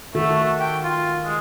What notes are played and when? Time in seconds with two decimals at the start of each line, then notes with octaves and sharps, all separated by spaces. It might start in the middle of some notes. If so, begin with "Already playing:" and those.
0.15 D#3 A3 F#4 A4
0.60 G5
0.83 F4
1.25 G#3